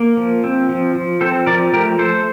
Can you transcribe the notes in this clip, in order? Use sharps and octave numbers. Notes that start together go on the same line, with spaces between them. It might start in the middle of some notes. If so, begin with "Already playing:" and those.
Already playing: A#3
F3
C4
F3
F3
C4 A4 C5
F3 A#4 D5
A3 G4 A#4
A3 A4 C5